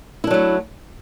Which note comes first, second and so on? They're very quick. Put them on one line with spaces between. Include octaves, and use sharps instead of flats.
E4 D4 F#3 A3